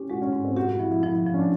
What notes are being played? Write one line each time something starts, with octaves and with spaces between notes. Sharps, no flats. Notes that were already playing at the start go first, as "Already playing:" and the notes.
Already playing: C#4 G4
G#3 F#4
C#4
G#2
C4
F#4 G4
F#4
F3 E4
E4
F3 E4
E4
F3
C#4
D4